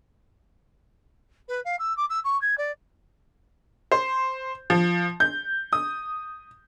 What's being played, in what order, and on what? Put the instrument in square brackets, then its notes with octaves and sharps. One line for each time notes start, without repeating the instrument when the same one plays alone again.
[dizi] B4
F5
E6
D6
E6
C#6
G#6
D5
[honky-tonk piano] C5
F3
G6
D#6